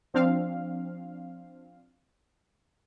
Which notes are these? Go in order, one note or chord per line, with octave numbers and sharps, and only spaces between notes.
F3 C4 D4 F5